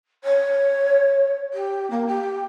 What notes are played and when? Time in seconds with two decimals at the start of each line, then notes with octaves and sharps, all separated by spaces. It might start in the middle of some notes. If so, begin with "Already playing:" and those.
0.24 C#5
1.53 G4
1.90 A#3
2.07 G4